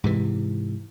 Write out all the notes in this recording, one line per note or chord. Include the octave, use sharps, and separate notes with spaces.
G#2 C3 E3